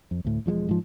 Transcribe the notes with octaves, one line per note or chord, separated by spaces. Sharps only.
F2
D2 A2
E1 F3 F#3 G#3
G#2 F3